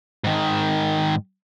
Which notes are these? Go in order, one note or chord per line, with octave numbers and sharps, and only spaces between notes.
G#2 D#3